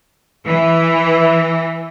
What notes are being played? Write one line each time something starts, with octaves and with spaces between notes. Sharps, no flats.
E3